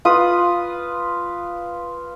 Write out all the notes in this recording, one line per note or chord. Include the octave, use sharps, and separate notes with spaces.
F4 B4 D#6